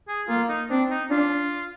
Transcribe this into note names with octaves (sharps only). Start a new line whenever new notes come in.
G#4
A#3 F4
D#4
C4 D4
D#4
D4 F4